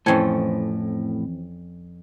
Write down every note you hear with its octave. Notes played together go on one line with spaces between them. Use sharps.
F2 A2 E3 C4 C#4 C5 A5 G#6